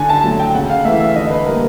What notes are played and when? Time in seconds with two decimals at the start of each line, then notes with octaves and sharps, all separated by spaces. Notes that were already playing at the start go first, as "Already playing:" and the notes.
Already playing: D3 G#5
0.09 A5
0.24 F#3 A3
0.39 G5
0.54 C#3 F#5
0.70 F5
0.85 E3 A3 E5
1.00 E5
1.16 D3 D#5
1.31 B4
1.46 G3 A#3 A#4